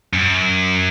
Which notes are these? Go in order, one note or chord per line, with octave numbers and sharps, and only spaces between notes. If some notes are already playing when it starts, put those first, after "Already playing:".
F#2